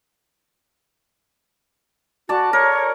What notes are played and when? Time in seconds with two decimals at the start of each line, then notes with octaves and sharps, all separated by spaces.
2.29 F#4 D5 A5
2.53 A#4 C#5